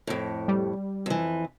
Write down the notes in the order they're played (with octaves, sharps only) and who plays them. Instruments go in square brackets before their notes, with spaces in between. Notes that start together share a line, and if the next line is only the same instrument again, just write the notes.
[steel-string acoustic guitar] F2 A2
[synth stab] G3
[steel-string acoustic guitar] F2 E3